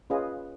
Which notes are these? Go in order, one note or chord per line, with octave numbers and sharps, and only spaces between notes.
C#4 F4 G#4 B4 D#5